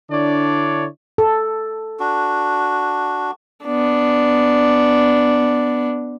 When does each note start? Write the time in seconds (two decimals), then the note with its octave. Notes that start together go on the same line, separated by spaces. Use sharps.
0.10 D3 D4 E4 C#5 D5
1.18 A4
2.00 D4 F#4
3.65 B3 D4